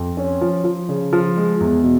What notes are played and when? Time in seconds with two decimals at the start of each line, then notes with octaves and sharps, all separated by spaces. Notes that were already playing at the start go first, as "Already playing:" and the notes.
Already playing: F2
0.17 C#4
0.41 F3
0.64 F3
0.89 C#3
1.13 F3
1.37 G#3
1.60 E2
1.84 B2